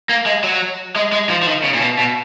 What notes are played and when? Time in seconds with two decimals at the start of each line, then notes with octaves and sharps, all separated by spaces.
0.09 A#3
0.26 G#3
0.44 F#3
0.96 G#3
1.12 G#3
1.30 F3
1.43 F3
1.47 D#3
1.64 C#3
1.74 A#2
1.81 B2
1.98 B2